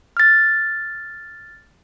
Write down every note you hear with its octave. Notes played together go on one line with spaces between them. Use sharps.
F6 A6